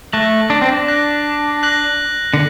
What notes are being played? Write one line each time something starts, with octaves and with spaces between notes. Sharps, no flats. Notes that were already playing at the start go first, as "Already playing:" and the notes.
A3 F#6 A#6 F#7
D4
C4
D4
F#6 A#6 F#7
F#6 A#6 F#7
D3